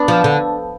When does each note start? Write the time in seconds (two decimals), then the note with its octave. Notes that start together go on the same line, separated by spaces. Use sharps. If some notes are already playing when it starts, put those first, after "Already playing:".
Already playing: B3 D4
0.08 F3
0.24 D3